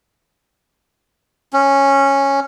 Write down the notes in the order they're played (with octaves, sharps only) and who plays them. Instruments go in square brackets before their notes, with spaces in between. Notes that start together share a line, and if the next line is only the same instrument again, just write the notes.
[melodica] C#4